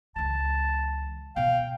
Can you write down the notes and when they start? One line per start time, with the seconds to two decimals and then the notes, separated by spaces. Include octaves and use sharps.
0.16 C#2 E3 A5
1.36 B2 B3 F5 G5